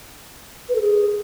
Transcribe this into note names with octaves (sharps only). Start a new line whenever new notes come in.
B4
A4
G#4